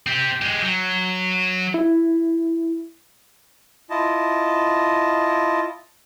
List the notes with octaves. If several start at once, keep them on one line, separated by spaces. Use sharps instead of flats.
C4 G4
G#3 G4
F#3
E4
E4 F4 D#5 A5